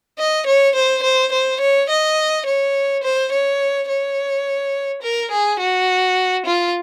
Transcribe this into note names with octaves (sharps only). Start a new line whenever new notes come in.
D#5
C#5
C5
C5
C5
C#5
D#5
C#5
C5
C#5
C#5
A#4
G#4
F#4
F4